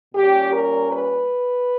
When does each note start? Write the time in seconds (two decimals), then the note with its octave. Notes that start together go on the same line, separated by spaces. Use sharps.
0.14 A#2 G3 C#4 G4
0.53 A#4
0.92 B4